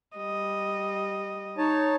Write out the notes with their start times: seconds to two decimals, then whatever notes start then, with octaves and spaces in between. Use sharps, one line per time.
0.17 G3 D#5
1.58 D#4 C#5 A5